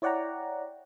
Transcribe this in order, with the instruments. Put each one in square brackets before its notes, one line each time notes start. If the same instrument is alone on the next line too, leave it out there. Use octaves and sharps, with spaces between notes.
[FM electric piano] E4 C#5 D5 F#5 G5 A#5